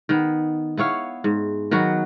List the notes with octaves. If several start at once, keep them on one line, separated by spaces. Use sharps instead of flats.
D#3 B3
B3 E4 C#5 F5
G#2
D#3 F#3 B3 F#4